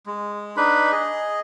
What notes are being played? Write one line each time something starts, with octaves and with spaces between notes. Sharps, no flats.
G#3
D4 D#4 B4 B5
G#4 D#5